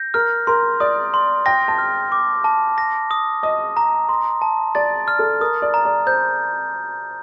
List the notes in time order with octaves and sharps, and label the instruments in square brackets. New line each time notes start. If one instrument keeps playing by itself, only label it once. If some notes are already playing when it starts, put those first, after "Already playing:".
Already playing: [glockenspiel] G6 A#6
[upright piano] A#4 [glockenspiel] F6
[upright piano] A#4 [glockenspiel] C6
[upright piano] D5 [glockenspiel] D#6
[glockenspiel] C6
[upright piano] G5 [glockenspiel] A#6
[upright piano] A5
[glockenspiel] F6
D6
A5
A#6
D#6
[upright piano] D#5 [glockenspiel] D#6
[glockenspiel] A#5
C6
A5
[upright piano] D5 [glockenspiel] A6
[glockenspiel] F6
[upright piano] A4
[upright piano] A#4 [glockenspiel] D#6
[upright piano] D5
[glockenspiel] A#5
[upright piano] D5
[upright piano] C5 [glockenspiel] G6